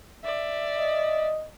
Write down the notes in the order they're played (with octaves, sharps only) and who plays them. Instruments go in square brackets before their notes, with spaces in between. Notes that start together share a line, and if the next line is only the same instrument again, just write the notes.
[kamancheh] D5 E5
[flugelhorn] D#5